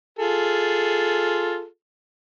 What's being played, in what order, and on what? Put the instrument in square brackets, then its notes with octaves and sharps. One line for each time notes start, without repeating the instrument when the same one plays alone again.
[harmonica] F4 G#4 A4